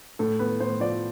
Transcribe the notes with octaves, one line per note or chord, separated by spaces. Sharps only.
A2 A4
B3 B4
A2 C5
F3 D5